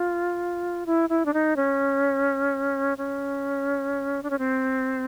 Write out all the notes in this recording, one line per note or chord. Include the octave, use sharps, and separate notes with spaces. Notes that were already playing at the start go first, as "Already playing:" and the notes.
Already playing: F4
E4
E4
D4
D#4
C#4
C#4
D4
C#4
C4